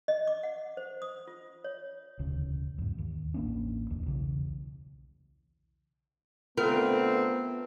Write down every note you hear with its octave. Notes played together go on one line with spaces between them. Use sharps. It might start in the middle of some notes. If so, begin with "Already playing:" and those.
D#5
D6
F#5
C5
D#6
F4
C#5
E1 D2 C#3
E2 G#2
D#2
A1 A#3 C#4 D4
D1 E2
B1 C#3 E3
D3 A3 B3 C4 F4 A#4